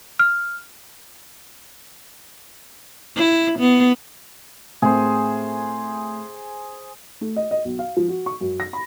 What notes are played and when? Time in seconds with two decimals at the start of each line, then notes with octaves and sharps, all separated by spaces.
0.19 F6
3.16 E4
3.59 B3
4.82 A2 C4 G#4 C5
7.21 A3
7.36 D#5
7.51 D#5
7.65 B1
7.79 F5
7.97 F3
8.08 F#4
8.26 C#6
8.41 F#2
8.60 A#6
8.73 B5